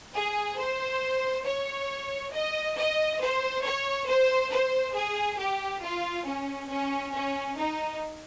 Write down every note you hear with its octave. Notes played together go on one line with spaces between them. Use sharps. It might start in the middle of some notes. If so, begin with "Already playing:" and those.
G#4
C5
C#5
D#5
D#5
C5
C#5
C5
C5
G#4
G4
F4
C#4
C#4
C#4
D#4